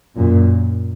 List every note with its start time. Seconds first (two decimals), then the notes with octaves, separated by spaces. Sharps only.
0.16 F#2 A#2